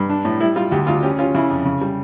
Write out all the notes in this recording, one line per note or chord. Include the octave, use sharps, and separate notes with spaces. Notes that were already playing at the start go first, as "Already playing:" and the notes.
Already playing: G2
D4
A2
G3 E4
G3 F4
D2 G4
D2 F4
C#4 G4
C#4 F4
C#3 E4
F2
C#3
G3